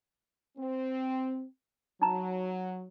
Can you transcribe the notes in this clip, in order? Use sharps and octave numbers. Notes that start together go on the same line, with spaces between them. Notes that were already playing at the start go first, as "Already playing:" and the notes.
C4
F#3 D#4 A#5